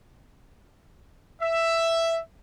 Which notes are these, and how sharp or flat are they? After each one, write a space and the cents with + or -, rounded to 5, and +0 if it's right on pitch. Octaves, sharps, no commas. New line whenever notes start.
E5 +5